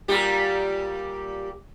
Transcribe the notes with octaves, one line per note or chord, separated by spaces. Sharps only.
A#2 G3 G4